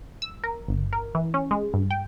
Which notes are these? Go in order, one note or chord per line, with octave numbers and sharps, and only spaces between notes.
E6
A#4
G1
A#4
E3
C#4
G#3
G2
G5